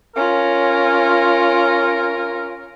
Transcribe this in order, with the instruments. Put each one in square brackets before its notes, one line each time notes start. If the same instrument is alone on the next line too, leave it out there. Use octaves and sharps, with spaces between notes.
[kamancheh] C#4 F4 [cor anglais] A#4